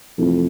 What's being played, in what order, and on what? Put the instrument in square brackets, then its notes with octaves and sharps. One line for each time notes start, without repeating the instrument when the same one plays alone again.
[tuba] F2 [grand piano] C3 E3 A3